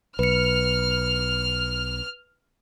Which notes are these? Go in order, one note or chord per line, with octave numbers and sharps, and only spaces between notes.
B1 B4 F6 C#7